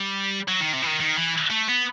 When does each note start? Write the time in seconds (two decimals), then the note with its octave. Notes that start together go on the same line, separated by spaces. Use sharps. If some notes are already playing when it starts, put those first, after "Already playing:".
Already playing: G3
0.48 F#3
0.61 D#3
0.73 C3
0.82 E3
0.87 D#3
1.00 D#3
1.17 E3
1.51 A3
1.69 B3